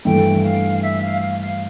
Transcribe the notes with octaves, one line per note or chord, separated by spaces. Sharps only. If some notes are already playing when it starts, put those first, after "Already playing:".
G2 E3 A3 G5
F5
E5
F5
F5
F5